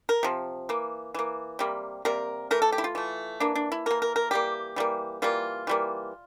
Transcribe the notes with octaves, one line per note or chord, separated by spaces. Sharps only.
A#4
C3 F3
E3 A#3
E3 A#3
C3 G3 A#3
C3 G3 A#3 A#4
E3 A3 A#4
A4
G4
E4
F4
E3 A3
E3 A#3 D4
D4
E4
E3 A#3 A#4
A#4
A#4
E3 G3 A#3 G4
E3 G3 A#3
E3 G3 A#3 F4
E3 G3 A#3